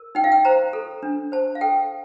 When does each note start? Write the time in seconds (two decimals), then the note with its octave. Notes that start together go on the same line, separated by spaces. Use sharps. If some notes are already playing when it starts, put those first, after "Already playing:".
Already playing: A#4
0.15 D#4 G5
0.24 F5
0.32 G5
0.45 C5 A#5
0.73 A4
1.03 D4
1.32 C5 A5
1.55 F5
1.61 A4 G5